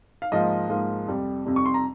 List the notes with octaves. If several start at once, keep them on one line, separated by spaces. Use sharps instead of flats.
F5
G#2 F3 A#3 D#5
G#2 F3 A#3
F2 C3 G3
F2 C3 G3
C#6
C6
A#5